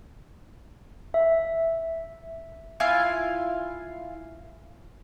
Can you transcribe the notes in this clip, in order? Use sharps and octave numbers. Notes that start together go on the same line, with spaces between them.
E5
E4 F4 F5 G#5